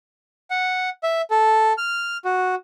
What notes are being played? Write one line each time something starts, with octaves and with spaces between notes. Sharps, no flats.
F#5
E5
A4
F6
F#4